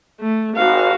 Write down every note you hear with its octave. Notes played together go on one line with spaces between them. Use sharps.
A3
G#1 F#4 F5